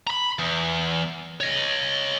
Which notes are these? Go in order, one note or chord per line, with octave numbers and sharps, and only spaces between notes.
A#5 B5
E2
C#5 D#5